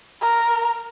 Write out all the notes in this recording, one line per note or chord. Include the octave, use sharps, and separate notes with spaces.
A#4